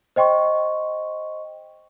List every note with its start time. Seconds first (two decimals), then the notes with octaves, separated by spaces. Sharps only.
0.16 C5 D#5 G5 C6 C#6